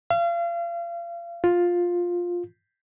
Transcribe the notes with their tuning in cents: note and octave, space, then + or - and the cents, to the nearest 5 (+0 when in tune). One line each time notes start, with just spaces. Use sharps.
F5 -35
F4 +10